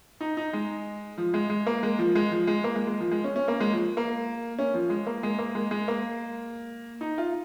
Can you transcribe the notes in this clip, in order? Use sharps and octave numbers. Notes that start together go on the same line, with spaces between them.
D#4
D#4
G#3
F3
G#3
G#3
A#3
G#3
F3
G#3
F3
G#3
A#3
G#3
G#3
F3
G#3
C#4
C#4
A#3
G#3
F3
A#3
C#4
F3
G#3
A#3
G#3
A#3
G#3
G#3
A#3
D#4
F4